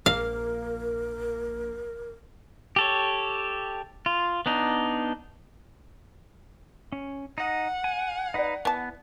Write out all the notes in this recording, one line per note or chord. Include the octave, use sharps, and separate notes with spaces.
A#1 A#3 A#4 F5
G4 A4 C#5
F4
B3 D4 D#4
C#4
D#4 D#5 F#5
G#5
D#4 B4 D5 E5
E3 B3 A5